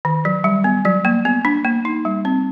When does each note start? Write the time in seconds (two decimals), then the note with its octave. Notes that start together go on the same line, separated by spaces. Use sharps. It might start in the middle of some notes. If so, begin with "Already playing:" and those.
0.05 D#3
0.25 F#3
0.44 G3
0.64 B3
0.85 F#3
1.05 A#3
1.25 B3
1.45 D4
1.65 A#3
1.85 D#4
2.05 G3
2.25 C4